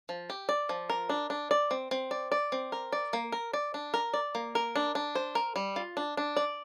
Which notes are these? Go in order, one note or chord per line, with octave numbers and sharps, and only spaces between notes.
F3
G4
D5
F3
A#4
D4
D4
D5
C4
C4
D5
D5
C4
A#4
D5
A#3
A#4
D5
D4
A#4
D5
A#3
A#4
D4
D4
C5
A#4
G3
F4
D4
D4
D5